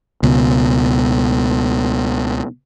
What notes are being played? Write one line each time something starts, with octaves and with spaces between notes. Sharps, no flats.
C#2 B2